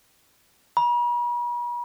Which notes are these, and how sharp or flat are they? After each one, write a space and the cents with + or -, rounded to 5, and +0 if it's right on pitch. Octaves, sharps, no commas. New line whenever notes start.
B5 -45